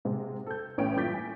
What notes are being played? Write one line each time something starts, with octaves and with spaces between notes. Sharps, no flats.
G#2 C3 G#3
A4 G6
A1 A2 C#4 G5 D7
G2 A#2 D6 G6 A6 B6
G#5